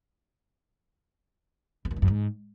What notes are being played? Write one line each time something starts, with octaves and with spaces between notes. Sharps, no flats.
E2
F#2
G2
F#2
G#2